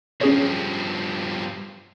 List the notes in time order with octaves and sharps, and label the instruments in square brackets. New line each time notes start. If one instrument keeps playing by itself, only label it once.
[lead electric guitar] G2 F3 [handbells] C#4 G#4 C#5